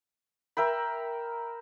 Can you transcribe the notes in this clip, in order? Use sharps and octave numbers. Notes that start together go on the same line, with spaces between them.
A#4 E5 G5 B5